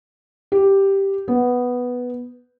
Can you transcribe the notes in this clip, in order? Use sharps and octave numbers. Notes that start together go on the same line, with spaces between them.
G4
B3